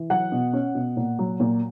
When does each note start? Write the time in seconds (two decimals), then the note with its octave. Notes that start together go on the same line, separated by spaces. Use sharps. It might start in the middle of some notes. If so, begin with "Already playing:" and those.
Already playing: E3
0.10 F#3 F#5
0.32 B2
0.53 C#4
0.75 B2
0.97 A#2
1.19 F#3
1.40 A#2